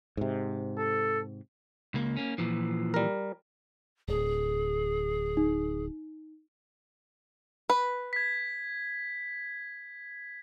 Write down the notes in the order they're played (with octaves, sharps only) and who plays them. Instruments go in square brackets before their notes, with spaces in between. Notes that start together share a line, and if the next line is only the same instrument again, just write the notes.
[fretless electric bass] G#2 C3
[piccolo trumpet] A4
[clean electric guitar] C#2 A#3
A#3 C#4
A#2 E3 F3
[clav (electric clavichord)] G3 A#4
[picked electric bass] D1 [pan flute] G#4
[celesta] D#4
[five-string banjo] B4
[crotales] G#6 B6